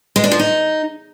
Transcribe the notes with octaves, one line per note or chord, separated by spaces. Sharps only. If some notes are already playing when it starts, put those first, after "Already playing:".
G#3
D4
F3
D#4